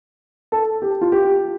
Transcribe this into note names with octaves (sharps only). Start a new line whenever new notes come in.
A4
G4
F4
G4